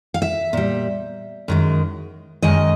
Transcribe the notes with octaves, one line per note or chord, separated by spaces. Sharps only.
F5
E5
A#2 G3
F#2 D#3 G#3
F#2 D#3 G#3 D#5